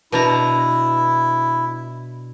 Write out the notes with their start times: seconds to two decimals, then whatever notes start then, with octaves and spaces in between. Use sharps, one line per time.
0.12 B2 D4 E4 A#5